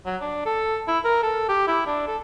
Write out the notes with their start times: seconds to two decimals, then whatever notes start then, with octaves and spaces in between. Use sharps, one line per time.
0.06 F#3
0.21 D4
0.46 A4
0.88 E4
1.05 A#4
1.23 A4
1.49 G4
1.68 E4
1.87 D4
2.08 A4